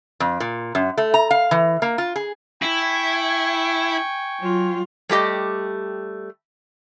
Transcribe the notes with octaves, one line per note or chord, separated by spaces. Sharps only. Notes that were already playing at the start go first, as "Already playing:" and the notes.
F2
A#2
F#2
A3
A#5
F5
E3
A#3
F4
G#4
E4 G5 G#5 C#6
F#3 F4
G3 A3 G4 D#5